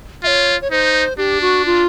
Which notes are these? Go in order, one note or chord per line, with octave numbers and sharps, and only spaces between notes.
F4 C#5 E5
C#5
D#4 C5
D4 G4
F#4
F4